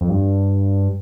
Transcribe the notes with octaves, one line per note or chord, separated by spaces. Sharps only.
F2
G2